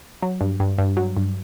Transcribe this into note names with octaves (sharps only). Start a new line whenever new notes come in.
F#3
G2
G2
G2
F#3
G2